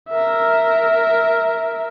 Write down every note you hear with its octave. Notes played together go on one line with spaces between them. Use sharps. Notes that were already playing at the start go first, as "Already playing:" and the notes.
A#4 E5